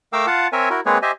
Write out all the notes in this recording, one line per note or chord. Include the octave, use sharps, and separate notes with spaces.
A3 A#4 F5 G5 D6 E6
F4 F5 F#5 A5
C4 A#4 C#5 E5 G#5
E4 F#4 A#4
G#3 A#3 C4 G#4 B4 C#5
G4 C5 D#5 E5 G#5